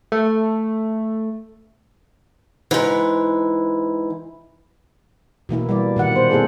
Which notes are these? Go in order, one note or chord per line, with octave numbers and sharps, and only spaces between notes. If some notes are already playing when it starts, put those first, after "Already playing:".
A3
G#2 E3
B2 E3 A#3 E4
G3 D5
A#2 D#3 F#5
B3 C5
A#3 C4 E4 G#4 A4